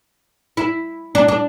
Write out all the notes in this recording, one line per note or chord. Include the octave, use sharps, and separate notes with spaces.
E4
D4
D4